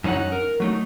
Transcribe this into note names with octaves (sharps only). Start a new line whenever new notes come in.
F#2 E3 C#4 D#4 F#5
A#4
F#3 A3 D#4